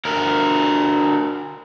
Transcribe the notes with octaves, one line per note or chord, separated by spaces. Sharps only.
D2 A#4